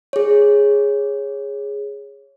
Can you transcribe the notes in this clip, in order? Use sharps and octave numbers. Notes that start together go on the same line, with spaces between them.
G#4 C#5